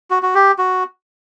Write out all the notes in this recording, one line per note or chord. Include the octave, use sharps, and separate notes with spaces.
F#4
F#4
G4
F#4